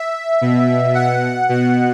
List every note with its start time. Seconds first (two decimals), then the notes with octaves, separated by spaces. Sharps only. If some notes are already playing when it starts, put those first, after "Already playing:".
Already playing: E5
0.41 B2
0.95 F#5
1.49 B2 F#5